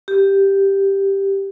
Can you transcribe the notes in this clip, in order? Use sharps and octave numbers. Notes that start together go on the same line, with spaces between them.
G4